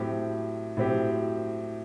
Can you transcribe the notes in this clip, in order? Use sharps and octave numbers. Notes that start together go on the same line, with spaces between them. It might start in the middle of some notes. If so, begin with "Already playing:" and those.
Already playing: A2 F#3 C4 G4
A2 F#3 C4 G4